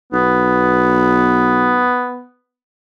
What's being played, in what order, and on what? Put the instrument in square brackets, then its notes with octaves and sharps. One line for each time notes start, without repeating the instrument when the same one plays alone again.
[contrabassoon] B1 [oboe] B3